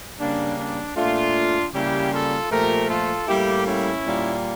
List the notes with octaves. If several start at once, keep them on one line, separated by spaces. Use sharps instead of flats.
C#3 G3 A#3 D4
D4
A#2 A3 D4 F4
C#3 G3 A#3 E4 G4
F4 A4
A#2 F3 A3 G4 A#4
F4 A4
A2 G3 A#3 E4 G4
C#4 E4
A#2 G3 A#3